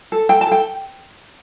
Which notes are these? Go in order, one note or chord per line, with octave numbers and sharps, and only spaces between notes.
A4
A4 G5
A5
A4 G5